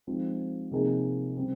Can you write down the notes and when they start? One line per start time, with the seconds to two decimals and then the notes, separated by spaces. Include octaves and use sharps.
0.07 F3 G#3 C4 D#4
0.71 C3 F3 A#3 D#4 G#4
1.36 C#3 G3 C4